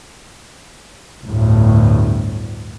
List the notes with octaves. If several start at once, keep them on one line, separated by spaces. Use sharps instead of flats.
G1 D2 A2